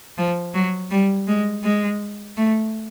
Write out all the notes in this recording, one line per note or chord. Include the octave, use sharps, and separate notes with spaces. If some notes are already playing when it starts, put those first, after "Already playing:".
F3
F#3
G3
G#3
G#3
A3